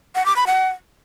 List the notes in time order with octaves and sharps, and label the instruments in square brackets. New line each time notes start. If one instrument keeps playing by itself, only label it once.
[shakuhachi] F#5
D6
B5
F#5